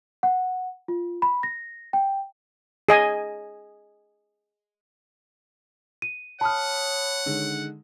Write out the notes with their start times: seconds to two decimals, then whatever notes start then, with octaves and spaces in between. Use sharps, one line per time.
0.23 F#5
0.88 F4
1.22 B5
1.43 A#6
1.93 G5
2.89 G#4 D#5 G#5
6.02 D#7
6.41 C#5 F#5 A5 B5 D#6 F6
7.26 D3 D#3 G#3